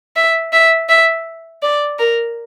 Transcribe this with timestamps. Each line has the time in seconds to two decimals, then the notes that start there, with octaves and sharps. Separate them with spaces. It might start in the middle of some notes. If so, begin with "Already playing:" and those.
0.16 E5
0.53 E5
0.89 E5
1.62 D5
1.99 A#4